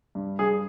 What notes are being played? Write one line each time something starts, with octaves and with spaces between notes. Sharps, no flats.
G2
G2 G#4